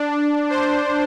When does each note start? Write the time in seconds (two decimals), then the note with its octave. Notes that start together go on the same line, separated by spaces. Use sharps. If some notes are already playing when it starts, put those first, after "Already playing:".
Already playing: D4
0.50 C5